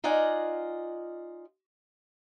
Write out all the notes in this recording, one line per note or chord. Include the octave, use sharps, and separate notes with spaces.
D#4 F4 D5 D#5 F#5 G#5